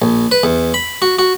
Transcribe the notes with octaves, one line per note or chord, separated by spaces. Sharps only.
A#1
B4
E2
B5
F#4
F#4